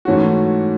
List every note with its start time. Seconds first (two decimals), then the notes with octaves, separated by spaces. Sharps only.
0.05 G#2 E3 A3 C#4 F#4